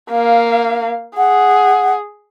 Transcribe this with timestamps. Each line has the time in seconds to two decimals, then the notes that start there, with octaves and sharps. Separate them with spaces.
0.11 A#3 F5
1.17 G#4 F#5